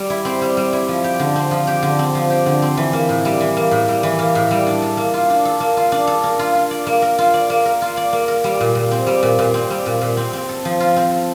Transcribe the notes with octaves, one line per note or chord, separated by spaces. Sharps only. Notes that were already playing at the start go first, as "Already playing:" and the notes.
Already playing: G3
E4
C4
G3
G3
E4
F3
G4
D3
C4
F3
G4
D3
C4
F3
G4
D3
C4
E3
A#3
A2
G3
E3
A#3
A2
G3
E3
A#3
A2
G3
D4
A4
A#3
F4
D4
A4
A#3
F4
D4
A4
A#3
F4
F4
D5
A#3
A#4
F4
D5
A#3
A#4
F4
D5
A#3
A#4
G3
A#2
A#2
C4
G3
A#2
A#2
C4
G3
A#2
A#2
C4
C4
A4
F3
F4
C4
A4